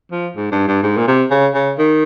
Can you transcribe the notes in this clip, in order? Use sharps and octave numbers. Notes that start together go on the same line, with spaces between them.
F3
G#2
G2
G2
G#2
A#2
C3
C#3
C#3
D#3